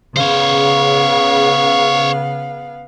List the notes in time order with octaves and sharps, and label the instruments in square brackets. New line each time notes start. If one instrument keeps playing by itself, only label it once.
[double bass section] C#3 [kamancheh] B3 F5 [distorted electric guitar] C5 C#5